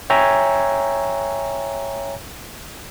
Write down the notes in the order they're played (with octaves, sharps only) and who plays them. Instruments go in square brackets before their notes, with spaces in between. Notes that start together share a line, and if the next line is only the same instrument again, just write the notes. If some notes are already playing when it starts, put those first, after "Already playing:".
[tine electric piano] C#5 E5 G5 G#5 A#5